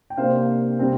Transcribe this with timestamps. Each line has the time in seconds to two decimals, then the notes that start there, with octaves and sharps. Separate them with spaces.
0.10 G5
0.17 C3 A#3 D4 C5 F5
0.79 C3 G3 C4